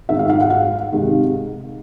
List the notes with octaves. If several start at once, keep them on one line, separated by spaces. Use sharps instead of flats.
G#2 D#3 G#3 E5
F5
F5
F#5
F5
C3 D#3 G#3